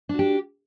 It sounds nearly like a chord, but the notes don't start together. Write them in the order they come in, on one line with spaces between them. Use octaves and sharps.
D4 F#4 G4